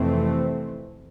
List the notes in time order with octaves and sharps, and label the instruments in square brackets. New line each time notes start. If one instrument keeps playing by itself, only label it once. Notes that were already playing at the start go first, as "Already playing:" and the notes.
Already playing: [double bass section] F2 C3 E3 A3 C4